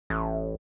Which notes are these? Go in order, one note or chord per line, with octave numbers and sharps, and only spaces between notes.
A1